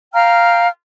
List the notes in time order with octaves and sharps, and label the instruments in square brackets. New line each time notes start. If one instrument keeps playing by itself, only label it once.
[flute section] F5 G5 A#5 F6